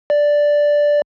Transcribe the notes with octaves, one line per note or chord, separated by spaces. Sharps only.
D5